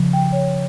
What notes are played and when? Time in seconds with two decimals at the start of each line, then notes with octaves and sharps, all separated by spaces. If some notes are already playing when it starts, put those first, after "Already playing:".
Already playing: C#3 F3
0.13 G5
0.32 C#5